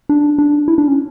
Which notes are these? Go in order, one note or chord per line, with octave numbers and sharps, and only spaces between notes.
D4
D4
E4
D4
C#4